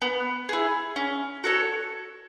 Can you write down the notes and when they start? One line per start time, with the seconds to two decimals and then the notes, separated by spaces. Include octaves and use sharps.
0.02 B3
0.49 E4 G#4
0.96 C#4
1.44 F#4 A4 C#5